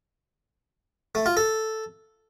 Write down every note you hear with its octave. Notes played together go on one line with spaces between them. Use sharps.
A3
F4
A4